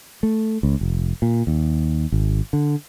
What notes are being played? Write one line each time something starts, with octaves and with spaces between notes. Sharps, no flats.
A3
C#2
F1
A#2
D#2
G#1
D3